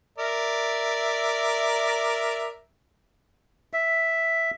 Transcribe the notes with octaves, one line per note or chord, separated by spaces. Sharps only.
A#4 D5 E5
E5